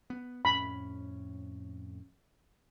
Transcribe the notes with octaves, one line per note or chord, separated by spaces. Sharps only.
B3
F2 A2 C#4 B5